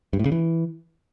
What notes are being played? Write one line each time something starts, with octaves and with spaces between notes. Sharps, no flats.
G2
A2
C#3
E3